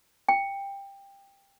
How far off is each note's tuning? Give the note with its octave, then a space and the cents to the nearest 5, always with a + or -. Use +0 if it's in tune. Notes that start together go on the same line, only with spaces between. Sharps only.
G5 +15